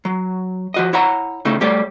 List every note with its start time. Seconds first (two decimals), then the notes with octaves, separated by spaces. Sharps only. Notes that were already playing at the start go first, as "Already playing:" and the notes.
0.05 F#3
0.74 F3 F#4 D#5
0.93 E4 C#5 F#5 A#5
1.45 A2 C#3 A3 D#4 E4
1.61 G3 A3 G4 C#5 D5